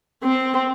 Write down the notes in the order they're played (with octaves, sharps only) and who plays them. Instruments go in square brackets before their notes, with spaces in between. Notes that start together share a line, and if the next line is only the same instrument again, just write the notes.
[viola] C4